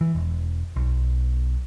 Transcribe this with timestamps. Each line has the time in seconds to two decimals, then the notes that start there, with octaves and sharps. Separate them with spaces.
0.01 E3
0.15 E1
0.76 B1